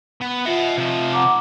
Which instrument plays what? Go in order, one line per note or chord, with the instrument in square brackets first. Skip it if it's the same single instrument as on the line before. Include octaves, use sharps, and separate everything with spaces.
[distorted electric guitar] B3
[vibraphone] F4 E5 [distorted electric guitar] D#5 F#5
[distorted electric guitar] C3 F3
[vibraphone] F#5 A#5 D6